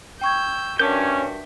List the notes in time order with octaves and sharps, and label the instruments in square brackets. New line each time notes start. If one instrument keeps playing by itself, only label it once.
[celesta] G5 C#6 G#6 [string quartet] E6 G6
[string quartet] G2 F#4 [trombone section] C#4 [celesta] A#4 A5 [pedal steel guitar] E5 D6 G6